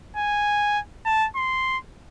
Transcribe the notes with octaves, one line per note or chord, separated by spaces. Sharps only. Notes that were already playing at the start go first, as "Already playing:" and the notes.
G#5
A5
C6